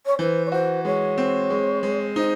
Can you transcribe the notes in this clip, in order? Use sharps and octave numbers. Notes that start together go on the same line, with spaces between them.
C#5
E3 C5
C#5
F#4 C5
G#3 C#5
C4
G#3
G#3
D#4 C5